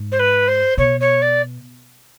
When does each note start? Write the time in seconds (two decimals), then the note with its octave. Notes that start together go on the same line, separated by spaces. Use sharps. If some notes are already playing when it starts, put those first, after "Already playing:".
Already playing: G#2
0.12 C5
0.19 B4
0.48 C5
0.77 B2 C#5
1.00 C#5
1.22 D5